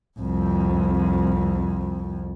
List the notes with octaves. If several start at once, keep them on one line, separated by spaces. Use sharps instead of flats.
C2 F2